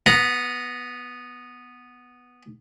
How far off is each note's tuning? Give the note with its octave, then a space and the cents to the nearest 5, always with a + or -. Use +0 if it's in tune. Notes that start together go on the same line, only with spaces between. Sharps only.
B3 +0 F#5 -40 A#5 +0